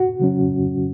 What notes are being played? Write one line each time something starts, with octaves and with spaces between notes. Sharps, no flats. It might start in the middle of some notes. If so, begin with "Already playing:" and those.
Already playing: F#4
C#3 F#3 C#4